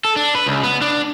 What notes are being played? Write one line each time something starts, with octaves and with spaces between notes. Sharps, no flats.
A4
D4
B4
C#2
B3
D4